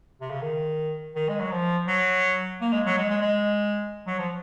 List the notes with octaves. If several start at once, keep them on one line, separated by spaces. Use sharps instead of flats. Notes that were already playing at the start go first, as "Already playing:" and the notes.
C3
C#3
D#3
D#3
G#3
F#3
F3
F#3
A#3
G#3
F#3
G#3
G#3
G#3
F#3
F3